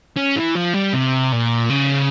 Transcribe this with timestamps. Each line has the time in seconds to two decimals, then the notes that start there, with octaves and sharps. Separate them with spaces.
0.16 C#4
0.36 E3
0.55 F3
0.74 G3
0.93 C3
1.32 A#2
1.70 C#3